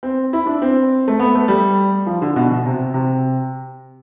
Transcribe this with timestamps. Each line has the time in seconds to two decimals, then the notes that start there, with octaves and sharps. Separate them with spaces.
0.03 C4
0.33 E4
0.46 D4
0.62 C4
1.08 A3
1.19 B3
1.35 A3
1.48 G3
2.06 F3
2.22 D3
2.36 B2
2.51 B2
2.66 C3
2.94 C3